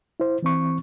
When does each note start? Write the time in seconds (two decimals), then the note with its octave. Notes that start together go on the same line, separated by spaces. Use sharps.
0.20 E4 C5
0.42 E3 C4 C#6